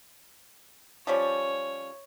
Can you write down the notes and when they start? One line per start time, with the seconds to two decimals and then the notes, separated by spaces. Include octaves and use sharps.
1.07 F3 G3 C#4 C#5